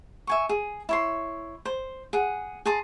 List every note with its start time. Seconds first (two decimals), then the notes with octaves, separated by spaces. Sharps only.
0.27 E5 G#5 C#6
0.49 G#4
0.89 E4 C#5 C6
1.65 C5
2.13 G#4 F#5
2.66 G#4 A5 A#5 C6